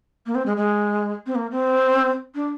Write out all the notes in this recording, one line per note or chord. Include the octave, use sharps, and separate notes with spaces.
A#3
C4
G#3
G#3
C4
A#3
C4
D4